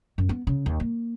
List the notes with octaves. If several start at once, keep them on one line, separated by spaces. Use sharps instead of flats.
F#2
B3
C#3
D#2
A#3